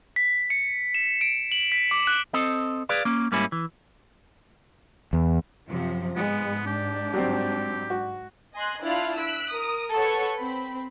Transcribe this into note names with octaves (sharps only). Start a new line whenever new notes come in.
B6
C#7
E7
D7
F#7
B6
D6
F#6
C4 A4 D#5
G#4 B4 D5 F5
A#3 C#4
G#2 G3 A#3 C#4 E4
E3
E2
F#2 C3 F3
G#2 G#3 B3
D4 G4
F#3 G3 C4
F#4
D#5 G#5 C6 F#6
D4 E4 F4 F5 F6 F#6
E6 F#6 B6 D7
A#4 D#6
A4 B4 C#5 F#5 C#6
C4 B5